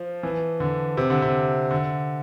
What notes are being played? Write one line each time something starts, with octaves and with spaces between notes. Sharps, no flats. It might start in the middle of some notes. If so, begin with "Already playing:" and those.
Already playing: F3
E3
D3
C3
D3
C3
D3